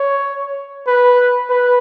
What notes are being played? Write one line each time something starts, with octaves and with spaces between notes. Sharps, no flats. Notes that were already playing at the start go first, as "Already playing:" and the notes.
Already playing: C#5
B4
B4